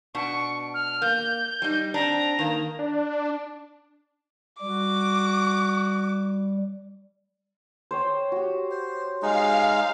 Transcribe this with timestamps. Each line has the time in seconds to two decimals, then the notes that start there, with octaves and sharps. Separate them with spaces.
0.15 B2 D4 C#6
0.74 F6
1.02 A#3 G6
1.62 G3 D#4
1.94 C4 D4 A#5
2.39 D#3 A#3
2.79 D4
4.61 G3 F#4 D6
7.91 C5 C#5 G5
8.32 F#4 G4
8.71 C5
9.22 G#3 D#4 F5